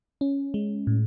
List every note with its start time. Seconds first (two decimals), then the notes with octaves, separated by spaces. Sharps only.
0.21 C#4
0.54 G#3
0.87 A2